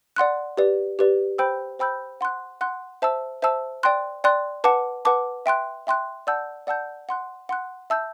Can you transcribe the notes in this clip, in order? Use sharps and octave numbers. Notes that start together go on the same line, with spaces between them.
D5 F#5 C6 F#6
G4 B4 D5
G4 B4 D5
C5 G5 B5 E6 G6
C5 G5 B5 E6 G6
F#5 C6 F#6
F#5 C6 F#6
C5 E5 A5 E6
C5 E5 A5 E6
D5 G5 C6 F#6
D5 G5 C6 F#6
B4 F#5 A5 D6
B4 F#5 A5 D6
E5 G5 C6 F#6
E5 G5 C6 F#6
D5 F#5 A5 E6 G6
D5 F#5 A5 E6 G6
F#5 C6 F#6
F#5 C6 F#6
E5 A5 E6 G6